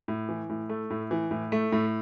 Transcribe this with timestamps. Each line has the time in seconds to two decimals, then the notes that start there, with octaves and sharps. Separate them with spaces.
0.08 A2
0.29 E3
0.49 A2
0.69 A3
0.90 A2
1.11 E3
1.31 A2
1.52 A3
1.72 A2